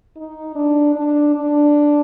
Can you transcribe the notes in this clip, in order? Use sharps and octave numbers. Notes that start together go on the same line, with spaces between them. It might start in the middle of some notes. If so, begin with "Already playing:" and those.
D#4
D4
D4
D4